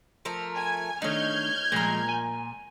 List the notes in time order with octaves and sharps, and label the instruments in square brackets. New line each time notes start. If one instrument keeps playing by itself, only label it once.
[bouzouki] F3 A3 A#4
[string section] G#5
[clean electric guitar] D#3 A3 D4 [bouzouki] D#4 C#5 [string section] F6 G6 G#6
[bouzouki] A#2 A#5 [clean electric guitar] F3 G#3 A3
[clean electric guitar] G#5